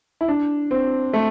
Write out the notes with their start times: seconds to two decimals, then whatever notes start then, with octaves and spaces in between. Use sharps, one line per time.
0.21 E4
0.28 D4
0.71 C4
1.13 A3